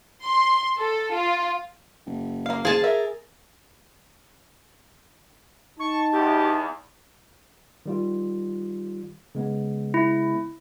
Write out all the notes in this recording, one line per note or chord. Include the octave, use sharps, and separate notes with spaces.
C6
A4
F4
F#1
A#3 F5
G#4 C5 F5 A5
A#4 E5
D#4 A5 C#6
E2 G4
D#3 G3 F4
C#3 G#3 B3
E4